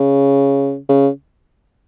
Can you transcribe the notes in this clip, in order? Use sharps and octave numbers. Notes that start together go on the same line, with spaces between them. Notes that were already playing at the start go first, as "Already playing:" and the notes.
Already playing: C#3
C#3